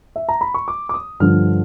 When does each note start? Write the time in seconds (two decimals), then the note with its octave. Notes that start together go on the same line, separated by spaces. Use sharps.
0.16 E5
0.29 A#5
0.41 B5
0.54 C#6
0.68 D6
0.89 D6
0.94 D#6
1.20 G2 D3 F3 F6